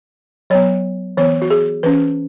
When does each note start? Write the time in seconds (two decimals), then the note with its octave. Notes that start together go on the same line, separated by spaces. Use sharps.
0.50 F#3 B3 C#5
1.17 E3 B3 C#5
1.42 F#4
1.50 G#4
1.83 E3 C#4 B4